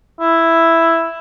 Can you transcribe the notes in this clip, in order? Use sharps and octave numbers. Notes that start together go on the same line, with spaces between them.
E4